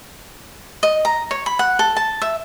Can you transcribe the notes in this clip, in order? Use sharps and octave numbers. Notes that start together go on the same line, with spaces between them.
D#5
A#5
C#5
B5
F#5
A4
A5
E5